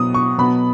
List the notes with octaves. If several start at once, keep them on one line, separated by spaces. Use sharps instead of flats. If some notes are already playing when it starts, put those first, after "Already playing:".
Already playing: B2 F#3 B3 D#6
C#6
B2 F#3 B3 B5